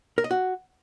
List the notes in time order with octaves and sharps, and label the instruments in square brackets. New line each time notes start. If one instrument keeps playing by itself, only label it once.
[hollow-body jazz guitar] A#4
D#5
F#4